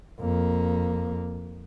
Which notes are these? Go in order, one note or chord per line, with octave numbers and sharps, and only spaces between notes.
F2 A#3